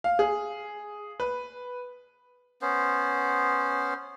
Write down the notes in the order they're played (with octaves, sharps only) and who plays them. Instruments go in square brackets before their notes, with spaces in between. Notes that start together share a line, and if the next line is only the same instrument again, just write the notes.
[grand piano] F5
G#4
B4
[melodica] B3 C#4 C5